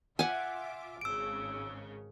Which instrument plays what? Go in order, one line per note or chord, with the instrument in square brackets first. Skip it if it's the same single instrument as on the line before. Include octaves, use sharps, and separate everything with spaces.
[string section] F4 E5 D6 [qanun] F#5 G#5
[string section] G#1 C#3 [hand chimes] E6 D7